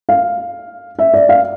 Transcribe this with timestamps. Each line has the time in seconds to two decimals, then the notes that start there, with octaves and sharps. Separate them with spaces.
0.09 F5
0.99 E5
1.14 D5
1.29 F5